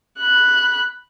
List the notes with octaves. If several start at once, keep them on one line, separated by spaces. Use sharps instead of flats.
B5 F#6